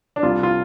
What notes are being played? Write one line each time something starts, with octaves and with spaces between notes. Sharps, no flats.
D4
C2 F4
F4